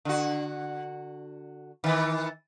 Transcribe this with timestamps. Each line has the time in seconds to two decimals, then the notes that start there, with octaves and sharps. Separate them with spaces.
0.05 D3 F#4
1.84 D#3 E3